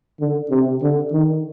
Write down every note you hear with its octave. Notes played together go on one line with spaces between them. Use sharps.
D3
C3
D3
D#3